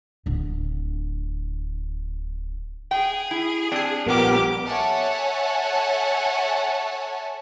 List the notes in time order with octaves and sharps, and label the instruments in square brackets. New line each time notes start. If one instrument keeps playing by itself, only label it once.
[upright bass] D1 D3
[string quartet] G#4 [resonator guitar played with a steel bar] G5
[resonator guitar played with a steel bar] E4
[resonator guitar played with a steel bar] C4 [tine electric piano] D4 G#5
[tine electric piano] A#1 F3 G3 [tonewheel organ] B3 A#4 [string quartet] G4 D6
[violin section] A4 C#5 E5 F#5 G#5 A5